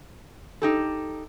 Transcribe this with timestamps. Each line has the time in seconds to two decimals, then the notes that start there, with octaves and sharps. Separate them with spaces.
0.62 D#4 G4 A4